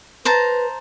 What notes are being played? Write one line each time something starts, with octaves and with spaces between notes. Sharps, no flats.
B4 C5 A5 A#5